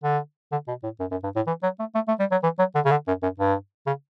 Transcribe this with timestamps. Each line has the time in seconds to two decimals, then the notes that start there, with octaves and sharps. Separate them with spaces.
0.04 D3
0.52 D3
0.68 B2
0.84 A2
1.00 F#2
1.11 F#2
1.24 G2
1.36 A2
1.47 E3
1.63 F#3
1.80 A3
1.95 A3
2.08 A3
2.20 G3
2.32 F#3
2.43 E3
2.59 F#3
2.75 D3
2.85 C#3
2.91 D3
3.08 F#2
3.23 F#2
3.40 G2
3.87 C#3